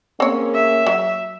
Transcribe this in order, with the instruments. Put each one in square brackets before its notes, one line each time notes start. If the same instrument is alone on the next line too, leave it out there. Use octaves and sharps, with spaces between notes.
[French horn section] A#3 C#4 G#4 [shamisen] C4 C#5
[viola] E5
[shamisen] F#3